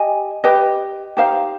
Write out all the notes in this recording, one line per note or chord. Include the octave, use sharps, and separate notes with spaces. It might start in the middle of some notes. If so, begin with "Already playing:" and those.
Already playing: G4 D#5 G#5
G4 B4 D#5
D#4 G4 C5 F5